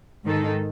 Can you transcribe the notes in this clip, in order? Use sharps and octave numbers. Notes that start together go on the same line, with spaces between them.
G#2 D#3 G#3 D#4 A4